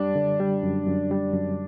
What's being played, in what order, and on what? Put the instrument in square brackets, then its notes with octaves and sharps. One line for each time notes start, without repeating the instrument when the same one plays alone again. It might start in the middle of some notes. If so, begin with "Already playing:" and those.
Already playing: [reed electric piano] F#2 G3 [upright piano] D4
[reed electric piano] D3
G3
F#2
F#2
G3
F#2